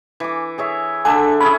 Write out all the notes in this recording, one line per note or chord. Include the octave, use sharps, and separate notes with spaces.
E3 D6
G#4 C#5 E5
D3 D4 E5 G#5
C#4 E4 G#4 B5